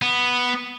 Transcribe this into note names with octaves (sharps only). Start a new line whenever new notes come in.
B3